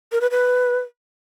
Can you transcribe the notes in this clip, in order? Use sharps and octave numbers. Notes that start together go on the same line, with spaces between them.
A#4
B4
B4